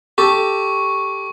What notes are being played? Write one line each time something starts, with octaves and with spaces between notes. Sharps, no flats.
G4 A4 C#6